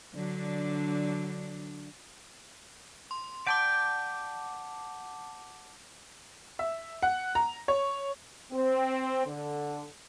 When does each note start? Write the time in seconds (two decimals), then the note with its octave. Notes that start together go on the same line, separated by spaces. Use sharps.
0.15 D3 F#3 D4
3.11 C6
3.47 D5 F#5 G5 A5 D6
6.59 E5
7.02 F#5
7.35 A#5
7.68 C#5
8.52 C4
9.26 D3